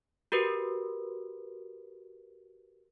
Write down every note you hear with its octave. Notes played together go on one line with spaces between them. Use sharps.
F#4 G4 A#4 B4